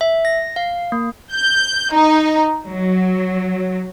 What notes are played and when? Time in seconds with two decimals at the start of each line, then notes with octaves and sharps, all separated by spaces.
0.01 E5
0.25 A#6
0.56 F5
0.92 A#3
1.34 G6
1.94 D#4
2.69 F#3